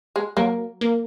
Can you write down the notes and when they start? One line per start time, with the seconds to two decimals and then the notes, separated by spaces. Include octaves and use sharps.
0.16 G#3
0.37 F#3 A#3
0.81 A#3